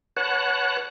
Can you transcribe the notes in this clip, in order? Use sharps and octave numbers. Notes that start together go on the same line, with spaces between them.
B4 C#5 F#5 A5 F#6